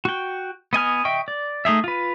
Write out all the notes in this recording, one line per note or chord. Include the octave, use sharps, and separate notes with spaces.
F#4 G5
B3 D#5 G#5 F6
D#5 E5 G5 C#6
D5
A3 D#4 G#4 E5
F4 B4